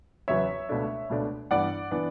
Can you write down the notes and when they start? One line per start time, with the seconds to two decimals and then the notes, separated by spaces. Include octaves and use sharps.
0.28 E2 C#3 F#3 B3 C#5 E5
0.69 C#2 B2 A3 D4
1.09 C#2 B2 A3 D4
1.51 G2 E3 B3 D4 D5 F#5
1.91 E3 B3 D4